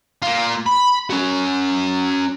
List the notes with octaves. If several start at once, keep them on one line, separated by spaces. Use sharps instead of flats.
A#3 F4
B5
C#4 F#4